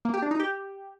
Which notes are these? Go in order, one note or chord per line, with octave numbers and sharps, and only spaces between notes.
A#3
G4
D4
D#4
G4